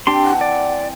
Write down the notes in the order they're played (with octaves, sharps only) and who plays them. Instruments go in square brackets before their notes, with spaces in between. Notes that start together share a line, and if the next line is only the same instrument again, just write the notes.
[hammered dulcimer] C4 A5 D6 [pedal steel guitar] D4 G4 C6
[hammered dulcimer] E3 [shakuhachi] F#5
[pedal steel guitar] D5